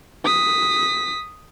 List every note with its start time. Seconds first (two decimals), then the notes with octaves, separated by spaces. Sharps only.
0.25 D#6 B6